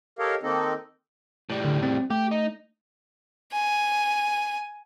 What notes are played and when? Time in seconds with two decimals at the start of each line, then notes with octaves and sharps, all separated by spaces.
0.19 G4 A4 A#4 C#5 D#5 F5
0.43 D#3 A#3 C4 D#4 A4 D#5
1.50 A2 G3
1.65 D3
1.83 C4
2.11 A3 G4
2.31 D#4
3.52 G#5